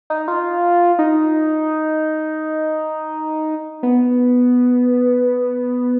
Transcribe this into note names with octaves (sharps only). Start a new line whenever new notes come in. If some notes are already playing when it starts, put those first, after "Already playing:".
D#4
F4
D#4
B3